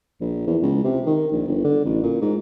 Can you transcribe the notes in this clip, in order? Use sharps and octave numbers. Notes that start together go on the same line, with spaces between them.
A#1
E2
C#2
C3
D#3
A#1
G1
D3
A1
A#2
G#2